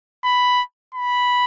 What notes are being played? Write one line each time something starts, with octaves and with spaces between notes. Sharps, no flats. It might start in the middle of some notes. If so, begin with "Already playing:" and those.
B5
B5